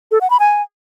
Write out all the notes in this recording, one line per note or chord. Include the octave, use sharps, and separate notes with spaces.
A4
F#5
B5
G#5